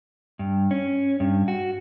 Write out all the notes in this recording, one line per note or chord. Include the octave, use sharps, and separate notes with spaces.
G2
C#4
G2
F#4